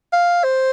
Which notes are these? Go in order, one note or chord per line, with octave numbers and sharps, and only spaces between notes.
F5
C5